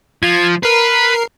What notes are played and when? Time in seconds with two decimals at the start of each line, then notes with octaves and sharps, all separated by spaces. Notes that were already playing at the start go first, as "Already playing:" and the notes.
0.23 F3 G#6
0.63 A#4 B4 C7